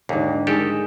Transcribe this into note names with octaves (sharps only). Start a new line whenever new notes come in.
D#2 G#2 D3
D#3 G#3 G4 A4